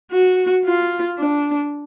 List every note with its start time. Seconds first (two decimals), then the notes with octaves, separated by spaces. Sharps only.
0.12 F#4
0.66 F4
1.18 D4